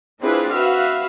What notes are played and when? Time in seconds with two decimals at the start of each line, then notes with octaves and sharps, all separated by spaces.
0.21 C4 D4 E4 F4 G#4 B4
0.53 F#4 B4 E5 F5